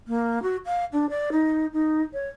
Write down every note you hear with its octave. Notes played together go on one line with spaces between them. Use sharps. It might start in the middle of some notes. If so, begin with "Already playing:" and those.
A#3
F#4
F5
D4
D5
D#4
D#4
C#5